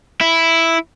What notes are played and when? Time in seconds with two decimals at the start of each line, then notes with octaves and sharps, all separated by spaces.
0.21 E4